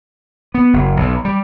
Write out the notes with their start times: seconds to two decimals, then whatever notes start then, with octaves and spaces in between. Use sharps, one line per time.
0.54 B3
0.73 F#1
0.97 B1
1.25 G3